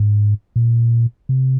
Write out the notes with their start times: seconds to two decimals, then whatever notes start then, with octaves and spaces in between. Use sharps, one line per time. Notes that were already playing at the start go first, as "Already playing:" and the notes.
Already playing: G#2
0.56 A#2
1.29 C3